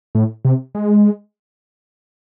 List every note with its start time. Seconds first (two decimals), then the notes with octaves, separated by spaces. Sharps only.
0.15 A2
0.45 C3
0.75 G#3